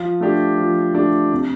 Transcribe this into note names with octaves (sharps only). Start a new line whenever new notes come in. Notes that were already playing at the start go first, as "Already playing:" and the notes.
Already playing: F3
A3 D4 G4
F3
A3 D4 G4
C3